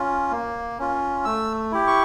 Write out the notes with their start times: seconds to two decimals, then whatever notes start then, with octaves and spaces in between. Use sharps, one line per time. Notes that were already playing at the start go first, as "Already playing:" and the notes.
Already playing: C#4 F4
0.32 A#3
0.79 C#4 F4
1.25 A3 E6
1.72 E4 G4
1.87 C#6